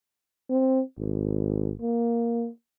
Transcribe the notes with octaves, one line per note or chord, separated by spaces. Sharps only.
C4
G#1
A#3